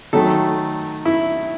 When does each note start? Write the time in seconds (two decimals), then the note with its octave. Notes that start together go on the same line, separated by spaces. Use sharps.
0.13 D#3 F#3 A3 A4
1.05 E4